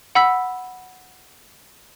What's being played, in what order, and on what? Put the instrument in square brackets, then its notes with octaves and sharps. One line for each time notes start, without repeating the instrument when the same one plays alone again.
[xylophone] F#5 B5 E6 B6